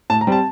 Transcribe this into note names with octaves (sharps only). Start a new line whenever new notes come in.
A2 A5
A#5
G3 C4 A5